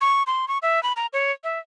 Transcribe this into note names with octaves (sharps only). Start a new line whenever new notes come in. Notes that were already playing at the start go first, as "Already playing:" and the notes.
C#6
C6
C#6
E5
B5
A#5
C#5
E5